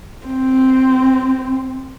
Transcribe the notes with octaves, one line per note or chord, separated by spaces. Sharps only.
C4